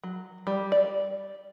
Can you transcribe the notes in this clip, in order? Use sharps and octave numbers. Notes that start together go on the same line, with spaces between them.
F#3
G3
D5